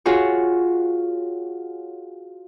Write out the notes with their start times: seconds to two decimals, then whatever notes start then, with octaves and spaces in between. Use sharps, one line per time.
0.06 F4 F#4 G#4 C#5